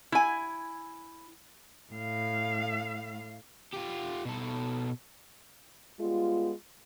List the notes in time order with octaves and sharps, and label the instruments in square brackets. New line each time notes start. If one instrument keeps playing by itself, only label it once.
[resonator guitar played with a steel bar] E4 G#5
[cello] A2 F5
[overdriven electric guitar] F4 G4
B2 A4
[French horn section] G3 G#3 B3 F4